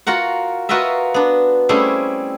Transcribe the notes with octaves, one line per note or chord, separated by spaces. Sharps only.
F4 F#4 A#4 F#5
F4 F#4 A#4 B4 D#5 E5
B3 D4
G3 A3 C4 C#4 E4 G#4